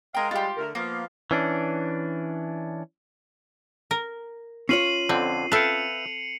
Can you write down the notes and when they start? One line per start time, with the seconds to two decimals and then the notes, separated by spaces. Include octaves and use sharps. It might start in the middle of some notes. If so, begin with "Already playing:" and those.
0.15 G#3 A#4 F5 G5
0.31 G3 G#3 F4 G4
0.57 D3 A3 A#4
0.75 F3 A#3 B3 F5
1.31 E3 C#4 D4
3.91 A#4
4.69 C#4 F4 C#5 C7 D#7 F#7
5.09 F2 D3 C4
5.52 A4 B4 E5 F5 G5 C#7 F7